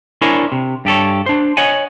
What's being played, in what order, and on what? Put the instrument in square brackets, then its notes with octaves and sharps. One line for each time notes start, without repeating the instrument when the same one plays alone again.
[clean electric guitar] D4 E4 A#4 C5 C#5 G#5
C3
G2 G4 A4 C#5
D4 C5
C#5 D#5 F#5 G#5